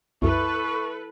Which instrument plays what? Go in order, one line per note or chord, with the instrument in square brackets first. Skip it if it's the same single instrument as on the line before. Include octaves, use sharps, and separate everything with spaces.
[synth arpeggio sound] C2 F#2 [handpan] E4 [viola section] A4 B4 [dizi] C#6